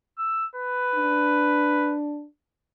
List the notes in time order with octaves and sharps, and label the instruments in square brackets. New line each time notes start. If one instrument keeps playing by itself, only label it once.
[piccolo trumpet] E6
B4
[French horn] D4